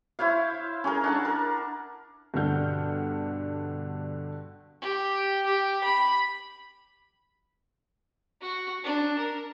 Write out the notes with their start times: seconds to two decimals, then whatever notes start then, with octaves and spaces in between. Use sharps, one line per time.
0.19 E4 C5 C#5 F5
0.84 C#4 G#4 A#4
1.04 D4 F#5 A5
1.25 A#4
2.34 G2 B2 D3 F#5 F6 G6
4.82 G4
5.46 G4
5.84 B5
8.41 F#4
8.84 D4
9.18 A#4